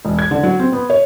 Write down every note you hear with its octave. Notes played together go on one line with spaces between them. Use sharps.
E1
G#6
D3
F#3
C4
B3
C#5